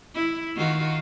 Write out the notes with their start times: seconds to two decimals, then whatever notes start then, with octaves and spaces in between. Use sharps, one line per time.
0.15 E4
0.57 D#3 F4 F#4